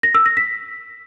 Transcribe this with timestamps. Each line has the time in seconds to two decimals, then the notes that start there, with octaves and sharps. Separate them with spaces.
0.03 A#6
0.15 E6
0.26 A#6
0.37 B6